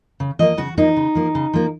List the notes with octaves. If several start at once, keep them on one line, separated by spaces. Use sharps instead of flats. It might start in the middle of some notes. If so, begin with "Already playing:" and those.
C#3
F3 A#3 D#5
C#3 F#4
F3 A#3 D#4
C#3
F3 A#3
C#3
F3 A#3